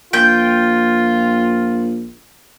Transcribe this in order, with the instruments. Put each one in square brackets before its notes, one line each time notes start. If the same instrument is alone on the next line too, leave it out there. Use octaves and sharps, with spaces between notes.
[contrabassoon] A#1 [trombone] F4 [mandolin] G5